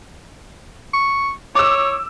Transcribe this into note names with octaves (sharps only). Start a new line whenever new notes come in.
C#6
C#5 D6 E6